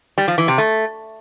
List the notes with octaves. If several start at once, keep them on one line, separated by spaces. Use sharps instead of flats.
G3
F3
E3
C3
A3